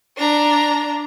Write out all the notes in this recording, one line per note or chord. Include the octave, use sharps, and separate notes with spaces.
D4 A#5